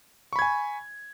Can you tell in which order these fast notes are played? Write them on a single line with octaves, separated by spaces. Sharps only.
C#6 B5 G#6 G#5